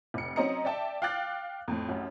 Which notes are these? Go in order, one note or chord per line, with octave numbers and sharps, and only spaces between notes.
F1 C#7
F#3 C4 C#4 D#5 A#5 C#7
D5 E5 G5 A5
F5 G5 D6 F#6 A6
F2 A2
A1 F#2